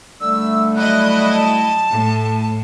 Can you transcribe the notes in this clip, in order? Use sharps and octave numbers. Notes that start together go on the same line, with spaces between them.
D3 G3 A3 E6
F#3 E4 D#5 F#6
A5
A2